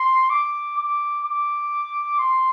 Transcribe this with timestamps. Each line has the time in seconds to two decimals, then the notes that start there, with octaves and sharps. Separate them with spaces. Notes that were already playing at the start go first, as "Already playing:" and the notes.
Already playing: C6
0.30 D6
0.78 D6
1.24 D6
2.19 C6